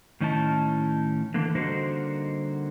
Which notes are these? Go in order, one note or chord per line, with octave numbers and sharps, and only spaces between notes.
A2 D#3 C#4 D#4 E4 A5
D3 E3 A#3
D3 G3 A#3 D#4 F#4 C5